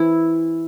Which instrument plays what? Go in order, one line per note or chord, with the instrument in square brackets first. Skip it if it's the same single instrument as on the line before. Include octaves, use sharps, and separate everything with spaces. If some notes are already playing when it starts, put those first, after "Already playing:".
Already playing: [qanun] E3 C4 E4